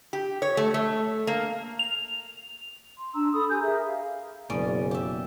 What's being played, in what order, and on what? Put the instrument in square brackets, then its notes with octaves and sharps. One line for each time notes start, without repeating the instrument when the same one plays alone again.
[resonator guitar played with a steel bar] G4
C#5
A3
A3
A#3
[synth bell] F7
[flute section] C6
D4 A#5 E6
A4 B5 D#6
G4 G#5 G6
G#4 A#4 E5 A#5
F5
[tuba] F#1 [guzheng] B2 C#4 D5
[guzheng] G4 E5